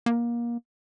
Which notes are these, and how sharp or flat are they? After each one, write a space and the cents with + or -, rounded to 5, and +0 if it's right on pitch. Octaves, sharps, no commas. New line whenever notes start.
A#3 +25